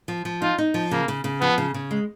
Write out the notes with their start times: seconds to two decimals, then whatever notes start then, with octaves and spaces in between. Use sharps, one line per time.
0.08 F3
0.25 F3
0.42 D#4 F4
0.58 D#4
0.74 F3
0.91 C#3 A#3
1.08 C#3
1.24 C#3
1.41 F3 B3
1.58 C#3
1.74 C#3
1.91 G#3